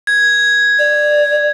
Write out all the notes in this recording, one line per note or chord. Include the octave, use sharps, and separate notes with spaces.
G#6
D5